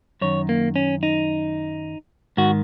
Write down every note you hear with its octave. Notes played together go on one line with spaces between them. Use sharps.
F#2 D#3 C#5
A#3
C#4
D#4
G#2 D#3 F#4